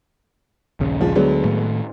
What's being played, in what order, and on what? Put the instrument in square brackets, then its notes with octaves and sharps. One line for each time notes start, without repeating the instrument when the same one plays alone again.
[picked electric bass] A#1 D#2 C#3
[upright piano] F3 G#3
[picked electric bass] D2 D3 D4 [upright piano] F#3 G#3 B3
[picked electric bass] A2 D#3 A3